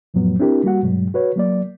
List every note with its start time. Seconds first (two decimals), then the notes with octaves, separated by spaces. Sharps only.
0.14 F2 A2 F3 F#3 B3
0.40 C4 D4 E4 G4 A#4
0.64 G3 A#3 F#4 F#5
0.83 G2 B2 F#3 G#3
1.14 F#4 B4 C#5
1.36 F#3 A#3 D5